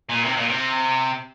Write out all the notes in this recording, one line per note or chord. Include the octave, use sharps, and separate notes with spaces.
A#2
C3
A#2
C3